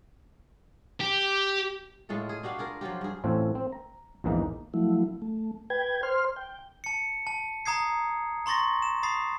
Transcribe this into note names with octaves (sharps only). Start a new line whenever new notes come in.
G4
A2 G#3 F4 A4
G#4
D4 F#4 G4 F5
F4 G#4 A#4
F3 F#3 F4 G4
G2 G#4
A1 A2 C4 F4 A4 C#5
C4
A#5
A#1 E2 G#2 E3 A#3 D#4
F3 F#3 A3 E4
A3
B4 G5 G#6
C5 C6 F6
G5
A5 C#7
A5
A#5 D#6 G#6 C7
A#5 C6 C#6 A6 A#6
E7
B5 D#6 A6 C7